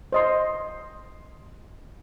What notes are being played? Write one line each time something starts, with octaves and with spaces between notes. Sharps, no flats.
C5 D#5 C6